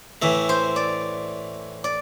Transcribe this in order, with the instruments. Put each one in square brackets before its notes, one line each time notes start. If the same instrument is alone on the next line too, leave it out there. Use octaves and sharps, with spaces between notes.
[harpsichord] A2 E3 A3 [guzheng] E5
[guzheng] C5
D5
D5